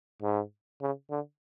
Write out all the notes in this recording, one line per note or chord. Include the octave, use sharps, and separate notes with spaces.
G#2
C#3
D3